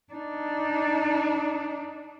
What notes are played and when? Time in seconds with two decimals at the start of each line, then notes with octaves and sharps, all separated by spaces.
0.14 D4 D#4